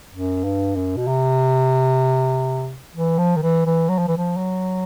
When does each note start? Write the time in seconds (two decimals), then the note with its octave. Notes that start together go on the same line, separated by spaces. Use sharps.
0.13 F#2
0.44 G2
0.76 F#2
0.97 B2
1.08 C3
2.95 E3
3.19 F3
3.36 D#3
3.42 E3
3.66 E3
3.89 F#3
3.98 F3
4.08 E3
4.17 F3
4.37 F#3